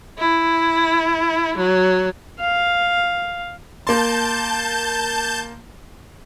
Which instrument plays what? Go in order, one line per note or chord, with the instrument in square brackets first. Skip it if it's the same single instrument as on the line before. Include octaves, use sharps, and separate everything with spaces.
[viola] E4
F#3
[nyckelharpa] F5
[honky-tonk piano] A#3 C6 [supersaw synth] A5 G6